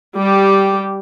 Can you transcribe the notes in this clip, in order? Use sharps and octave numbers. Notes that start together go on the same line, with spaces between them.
G3 G4